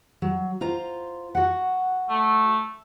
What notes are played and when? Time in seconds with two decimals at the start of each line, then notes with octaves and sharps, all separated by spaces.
0.22 F#3
0.61 F4 C5 A#5
1.35 F#4 F#5
2.10 A3